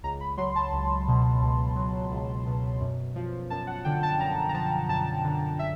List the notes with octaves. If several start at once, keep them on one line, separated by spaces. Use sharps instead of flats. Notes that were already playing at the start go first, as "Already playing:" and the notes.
C#2 A#5
B5
F#3 C6
A5
C#2
B2
C#2
F#3
C#2
B2
F#2
F3
F#2 A5
F#5
D3 G5
A5
F#2 A#5
A#5
F3 A5
F#2 A5
D3
E5